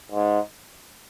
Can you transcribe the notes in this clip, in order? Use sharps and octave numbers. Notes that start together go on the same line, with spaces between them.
G#2